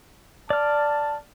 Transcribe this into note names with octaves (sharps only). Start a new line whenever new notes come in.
D5 A5 F6